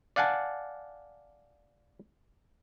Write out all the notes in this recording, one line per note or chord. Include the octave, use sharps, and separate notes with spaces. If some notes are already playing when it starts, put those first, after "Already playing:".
D5 F5 F#5 G#5 A5